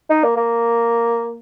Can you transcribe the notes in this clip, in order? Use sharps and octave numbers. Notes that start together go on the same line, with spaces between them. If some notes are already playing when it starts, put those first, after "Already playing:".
D#4
A#3
A#3